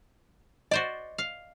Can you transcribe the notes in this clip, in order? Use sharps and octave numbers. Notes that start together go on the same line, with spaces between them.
F#4 C5 D5 D#5
F5